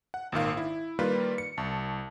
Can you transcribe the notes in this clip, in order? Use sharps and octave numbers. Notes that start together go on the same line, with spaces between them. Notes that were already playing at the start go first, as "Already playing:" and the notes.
F#5
G#1 A#2 D#3 F5
E4
D#3 G3 A#3 F4 B4
C#7
C2 A5